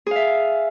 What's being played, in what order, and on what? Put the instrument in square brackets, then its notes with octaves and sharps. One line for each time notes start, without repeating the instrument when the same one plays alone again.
[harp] G#4
F5
E5